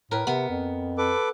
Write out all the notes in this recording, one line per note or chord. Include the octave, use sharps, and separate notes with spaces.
A2 A#4 B4
C3 B3
F2
A4 B4 D6